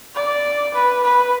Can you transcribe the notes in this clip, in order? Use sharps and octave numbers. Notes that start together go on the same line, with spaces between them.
D5
B4
B4